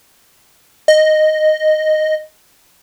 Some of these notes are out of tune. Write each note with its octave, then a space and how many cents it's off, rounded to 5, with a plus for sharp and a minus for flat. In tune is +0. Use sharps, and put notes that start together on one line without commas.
D#5 -5